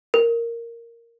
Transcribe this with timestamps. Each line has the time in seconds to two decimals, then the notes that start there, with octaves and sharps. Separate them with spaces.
0.14 A#4